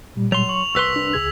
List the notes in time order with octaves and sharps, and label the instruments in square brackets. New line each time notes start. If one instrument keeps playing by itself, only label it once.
[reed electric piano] A#2 G3
[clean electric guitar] F#3 C6 [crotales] F7
[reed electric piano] C#6 [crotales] F#7
[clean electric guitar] C2 B4 C6 [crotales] E6 B6
[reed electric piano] D4
C#2 G#4 G#6